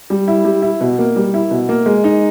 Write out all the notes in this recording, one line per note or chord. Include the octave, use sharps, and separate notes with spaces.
G3
E4
G3
E4
B2
A#3
G3
E4
B2
A#3
G#3
D#4